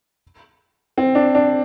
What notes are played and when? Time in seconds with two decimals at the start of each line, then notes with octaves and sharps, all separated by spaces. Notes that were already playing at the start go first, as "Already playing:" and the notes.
0.98 C4
1.15 D4
1.35 D4